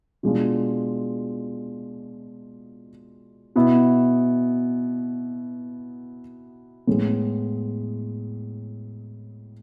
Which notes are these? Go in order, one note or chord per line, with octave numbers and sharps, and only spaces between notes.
B2 G#3 D4 F4
B2 B3 E4
A2 G#3 B3